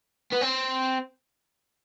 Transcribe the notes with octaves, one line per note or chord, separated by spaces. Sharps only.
B3
C4